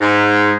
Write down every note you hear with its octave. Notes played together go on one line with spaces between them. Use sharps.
G#2